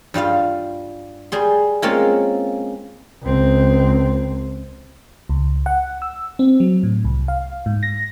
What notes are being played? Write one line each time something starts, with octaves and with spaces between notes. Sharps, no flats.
G2 G3 F4 F5
G3 G#4 C6
G#3 A#3 C4 C#4 F4
C#2 C4
C#2
F#5
E6
C4
F#3
A2
C2
F5
G#2
A#6